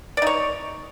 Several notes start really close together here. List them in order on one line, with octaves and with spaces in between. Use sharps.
D5 D#4 C#5